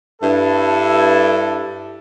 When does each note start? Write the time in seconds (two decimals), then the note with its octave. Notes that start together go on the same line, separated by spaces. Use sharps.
0.22 G2 E4 A4